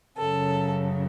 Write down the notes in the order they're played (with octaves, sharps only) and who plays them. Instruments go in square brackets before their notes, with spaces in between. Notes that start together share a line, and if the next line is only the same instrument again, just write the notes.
[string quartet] F#2 C#3 F#3 A4